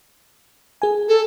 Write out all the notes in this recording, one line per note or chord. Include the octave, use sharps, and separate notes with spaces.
G#4 G#5
A4